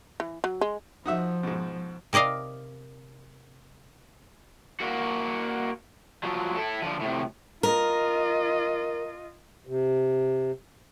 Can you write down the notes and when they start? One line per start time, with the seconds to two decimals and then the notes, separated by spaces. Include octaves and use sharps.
0.20 E3
0.44 F#3
0.61 G#3
1.06 F3 D#4 F#4 E5
1.43 G#2 B2
2.13 C3 A#4 D5 D#5 F5
4.80 A#3 F#4
6.23 F3 F#3
6.55 E4 A4
6.82 D3 F3
7.01 A2 C3
7.63 F4 A#4 D#5
9.67 C3